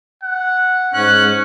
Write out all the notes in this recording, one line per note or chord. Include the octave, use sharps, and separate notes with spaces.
F#5
G#2 C#4 F#6